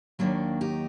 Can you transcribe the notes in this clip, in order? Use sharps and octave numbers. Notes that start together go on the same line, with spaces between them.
D#2 D#3 F#3 A#3 D4
D#4 G4